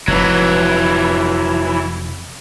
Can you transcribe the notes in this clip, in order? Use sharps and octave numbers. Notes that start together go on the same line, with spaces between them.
F1 E3 F#3